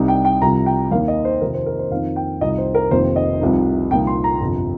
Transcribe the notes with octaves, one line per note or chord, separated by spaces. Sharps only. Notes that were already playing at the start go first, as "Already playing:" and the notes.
Already playing: C2 C3 G3 D#4
G5
G5
C2 C3 F3 A#5
G5
D#2 D#3 A#3 D#4 F5
D#5
C5
F2 C3 D#3 C4 A#4
C5
A#4
C5
F2 D#3 C4 D#4 F5
G5
C2 C3 F3 D#4 D#5
C5
A#4
F1 F2 C3 D#3 A#3 C5
D#5
C2 C3 F3 D#4
C2 A#2 F3 A#3 D#4 G5
C6
A#5
G1 F2 C3